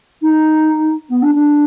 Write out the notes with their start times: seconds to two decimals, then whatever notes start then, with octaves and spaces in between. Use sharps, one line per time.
0.22 D#4
1.09 B3
1.22 D4
1.34 D4